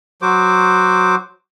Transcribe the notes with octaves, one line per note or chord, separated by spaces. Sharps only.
F#3 F#4 C5 D6